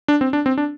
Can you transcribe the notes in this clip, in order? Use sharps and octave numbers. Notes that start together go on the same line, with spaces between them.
D4
C4
D4
C4
D4